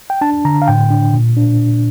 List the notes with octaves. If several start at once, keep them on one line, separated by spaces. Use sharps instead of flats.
G5
D4 A5
D3 A#5
F5
A2 G5
D4
A#2
D4